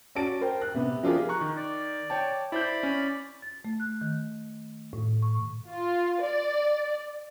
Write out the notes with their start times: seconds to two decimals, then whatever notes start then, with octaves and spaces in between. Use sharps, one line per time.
0.15 C#4 F#4 D5 A5 A6 D7
0.41 A#4 C5 G5
0.61 F#6
0.74 C3 B3
1.03 F3 D4 F4 G4 G#4 A#4
1.29 A#5 C#6 F#6
1.41 D#3
1.56 D5
2.10 C#5 G5 A5
2.52 E4 C5 D5 B5 G6
2.83 C#4
3.42 A6
3.65 A3
3.80 F#6
4.01 D#3
4.93 A2
5.22 C#6
5.67 F4
6.21 D5